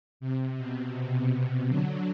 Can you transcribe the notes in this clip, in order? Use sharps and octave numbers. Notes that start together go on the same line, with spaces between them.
C3
B2
C3
C3
D3 F#3